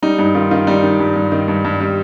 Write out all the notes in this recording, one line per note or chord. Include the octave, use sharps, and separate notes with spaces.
G3 D#4
G2 D#4
D#3 F4
D#3 F4
G3 D#4
D#3
G2
G2
D#3
G2
G2
G3